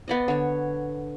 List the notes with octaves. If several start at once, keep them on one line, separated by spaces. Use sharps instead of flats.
B3 D5 D#5
D3 C#5